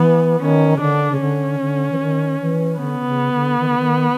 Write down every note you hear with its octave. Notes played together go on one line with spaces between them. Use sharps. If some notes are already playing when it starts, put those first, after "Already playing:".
Already playing: E3 B3
D#3 C#4
C#3
D3 D4
C#3
D3 C#4
D3
E3
D#3
E3
D3 B3
D3
C#3
D3
D#3
D3
D#3